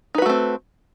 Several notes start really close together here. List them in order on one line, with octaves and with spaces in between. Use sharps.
D#4 B4 F#4 A3 C4